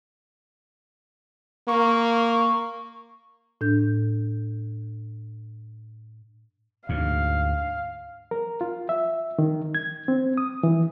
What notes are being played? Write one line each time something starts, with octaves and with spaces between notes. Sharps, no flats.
A#3 C#6
A2 D4 G6
D2 G#2 F5
A#4
F4
E5
D#3
G#6
C4
D#6
E3